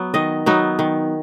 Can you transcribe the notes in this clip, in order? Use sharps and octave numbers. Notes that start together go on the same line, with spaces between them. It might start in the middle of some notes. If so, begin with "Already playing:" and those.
Already playing: F#3 B3
D#3 D#5
F#3 B3 D#4
D#3